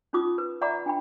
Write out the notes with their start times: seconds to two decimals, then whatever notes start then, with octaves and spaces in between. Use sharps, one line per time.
0.13 C#4 D#4 F4 D6 D#6
0.38 B4
0.62 D5 E5 F#5 A#5 B5 D6
0.86 D4 G5 B5